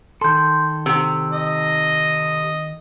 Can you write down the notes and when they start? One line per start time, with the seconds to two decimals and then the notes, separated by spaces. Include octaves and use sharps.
0.21 D#3 A4 C6 G6
0.86 C3 E6
1.30 D#5